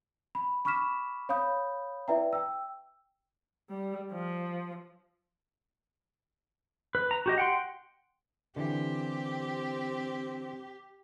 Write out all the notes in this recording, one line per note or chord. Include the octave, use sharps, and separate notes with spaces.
B5
B5 C#6 D6 F6 B6 E7
C#5 F5 B5 D#6 G6
E4 B4 D5 E5 G5 A#5
G5 E6
G3
F3
B4
A#5
F#4 G4 D#5
F#5 G5 C6
D3 E3 C4 G4